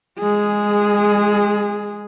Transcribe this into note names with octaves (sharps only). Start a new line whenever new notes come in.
G#3 G#4